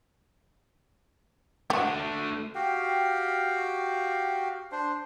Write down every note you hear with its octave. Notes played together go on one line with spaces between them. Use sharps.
A3 D4 F#4 G4
F#4 G4 F5 G5
D4 C5